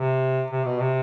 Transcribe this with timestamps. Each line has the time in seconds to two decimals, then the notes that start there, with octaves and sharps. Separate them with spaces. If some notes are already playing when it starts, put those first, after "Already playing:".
Already playing: C3
0.51 C3
0.65 B2
0.80 C3